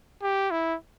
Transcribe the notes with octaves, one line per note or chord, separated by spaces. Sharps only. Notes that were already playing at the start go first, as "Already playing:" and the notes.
G4
E4